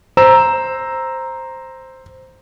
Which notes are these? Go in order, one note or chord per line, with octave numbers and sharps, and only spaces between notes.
C5 A#5 E6 E7